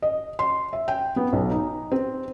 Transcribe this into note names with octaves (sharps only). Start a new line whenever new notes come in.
D#5
C6
E5
G5
B3
B1
D#4
C4